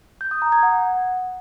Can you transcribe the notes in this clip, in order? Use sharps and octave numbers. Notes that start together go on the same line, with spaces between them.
G6
D#6
A#5
G#6
F#5